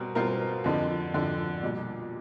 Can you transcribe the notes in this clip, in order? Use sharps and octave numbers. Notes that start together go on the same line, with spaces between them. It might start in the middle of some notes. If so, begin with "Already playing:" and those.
Already playing: B2 G3 C4 A#4
B2 G3 C4 F4 A#4
F2 D3 F3
F2 D3 F3
B1 A#2 G3